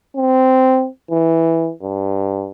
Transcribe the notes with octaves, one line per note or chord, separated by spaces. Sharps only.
C4
E3
G2